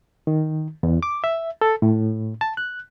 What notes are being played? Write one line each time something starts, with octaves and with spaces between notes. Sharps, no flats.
D#3
E2
D6
E5
A4
A2
A5
F#6